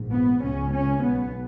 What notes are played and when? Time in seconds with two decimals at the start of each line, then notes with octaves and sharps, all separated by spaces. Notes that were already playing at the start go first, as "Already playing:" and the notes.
Already playing: A#1 G#2
0.13 B3
0.42 C#2 C#3 C#4
0.73 C#4
1.03 B1 B2 B3